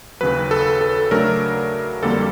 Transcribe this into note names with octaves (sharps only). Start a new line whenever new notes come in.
D#2 C#3 F#3 B4
A4
A4
C#3 F#3 A3 D4 A#4
F2 D3 G3 A#3 A4